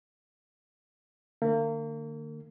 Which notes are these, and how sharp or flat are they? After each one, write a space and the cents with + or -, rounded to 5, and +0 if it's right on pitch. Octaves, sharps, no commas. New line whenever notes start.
D3 +30 A#3 -35